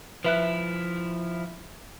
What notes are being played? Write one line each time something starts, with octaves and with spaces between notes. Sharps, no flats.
F3 E4 B4 E5 F#6